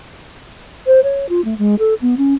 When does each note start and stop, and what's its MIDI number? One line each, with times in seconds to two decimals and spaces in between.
0.87 1.00 72
1.04 1.29 73
1.29 1.44 65
1.45 1.58 57
1.58 1.75 56
1.79 1.94 69
2.02 2.15 59
2.18 2.34 61